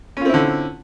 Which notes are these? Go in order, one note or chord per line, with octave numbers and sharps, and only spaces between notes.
D3 C4 C#4 E4 F4